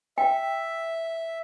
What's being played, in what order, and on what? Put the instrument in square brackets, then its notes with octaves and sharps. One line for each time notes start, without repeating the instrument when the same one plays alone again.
[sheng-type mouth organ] E5 [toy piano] G5